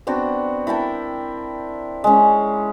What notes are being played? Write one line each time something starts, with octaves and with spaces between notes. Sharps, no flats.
B3 C4 D4 F#4
E4 A#4 G5 A5
G#3 C#4